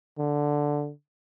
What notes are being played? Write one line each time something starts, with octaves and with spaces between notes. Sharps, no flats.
D3